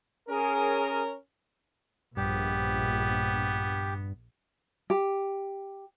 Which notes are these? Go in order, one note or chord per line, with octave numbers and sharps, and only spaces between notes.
C#4 G#4 A#4 G#5
A#1 G2 B3 G4
G4